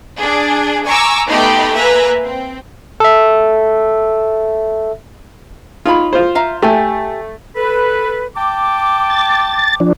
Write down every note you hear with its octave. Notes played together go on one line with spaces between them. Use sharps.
D4 G#4
G#5 A#5 C#6 D6 E6
A3 B3 D#4 G4 B5 C6
A#3 B4 E5 G#5 A#5
C4
A4 E5
D#4 F4 C#5 B5
F4 C5
E5 F5 A#5
A3 G4 G#5
A4 B4
G5 A5 D6
A6
F3 D4